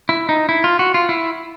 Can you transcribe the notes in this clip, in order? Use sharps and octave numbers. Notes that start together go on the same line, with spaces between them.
E4
D#4
E4
F4
F#4
F4
E4